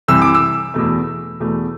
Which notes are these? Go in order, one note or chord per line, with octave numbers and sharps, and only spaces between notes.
C2 C3 E3 E6
D6
E6
E2 B2 A3
E2 B2 A3